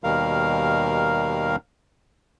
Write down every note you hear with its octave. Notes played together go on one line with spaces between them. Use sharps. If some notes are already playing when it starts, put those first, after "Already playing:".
D#2 B2 D#3 G3 A#4 F5